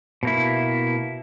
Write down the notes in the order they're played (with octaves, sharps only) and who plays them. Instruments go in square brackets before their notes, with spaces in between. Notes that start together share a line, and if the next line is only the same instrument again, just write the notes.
[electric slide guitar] B2 A#3 E4